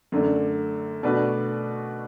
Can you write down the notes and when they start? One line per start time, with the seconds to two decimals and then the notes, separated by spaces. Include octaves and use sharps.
0.12 F#2 D3 A3 D4
1.03 B2 A3 D4 F#4 B4